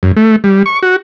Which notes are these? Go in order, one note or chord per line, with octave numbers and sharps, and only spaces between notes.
F#2
A3
G3
C#6
F#4